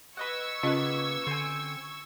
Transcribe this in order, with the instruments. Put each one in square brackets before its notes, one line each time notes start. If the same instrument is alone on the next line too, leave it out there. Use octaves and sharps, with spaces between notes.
[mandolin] B4 D#5 F#5 [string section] C#6 E6 G#6
[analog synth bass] C#3 [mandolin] A#3 B3 B4 [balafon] C#4 F4 D#5
[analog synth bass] D3 [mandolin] C4 G#5